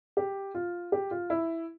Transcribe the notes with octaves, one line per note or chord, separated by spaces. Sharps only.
G4
F4
G4
F4
E4